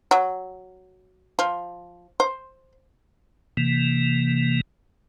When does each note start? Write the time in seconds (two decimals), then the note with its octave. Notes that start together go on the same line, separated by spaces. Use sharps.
0.11 F#3
1.39 F3
2.20 C5
3.57 C3 E3 A#3